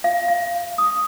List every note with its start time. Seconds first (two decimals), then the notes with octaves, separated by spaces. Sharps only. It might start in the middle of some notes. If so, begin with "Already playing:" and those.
0.04 F5
0.28 F5
0.78 D#6